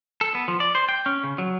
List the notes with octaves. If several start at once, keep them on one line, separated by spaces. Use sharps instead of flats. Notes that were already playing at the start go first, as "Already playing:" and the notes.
A4
B3
F3
D5
C5
G5
C#4
C#3
F#3